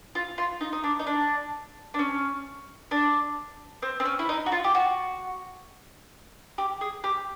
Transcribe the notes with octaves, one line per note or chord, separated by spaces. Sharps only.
F4
F4
D#4
D#4
D4
D#4
D4
D4
C#4
D4
C4
C4
C#4
E4
D#4
F#4
F4
G4
F#4
G4
G#4
G4